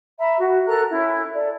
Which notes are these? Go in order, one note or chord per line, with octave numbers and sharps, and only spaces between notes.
E5 A#5 B5
F#4
A4 A#4 A#5 F#6
C#4 E4
A4 D5